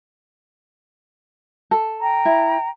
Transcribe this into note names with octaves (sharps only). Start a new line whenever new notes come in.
A4
G5 A#5
E4